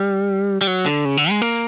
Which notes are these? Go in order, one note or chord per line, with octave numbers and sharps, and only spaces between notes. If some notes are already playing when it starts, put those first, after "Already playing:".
Already playing: G3
G3
F#3
D3
C#3
D3
G#3
A#3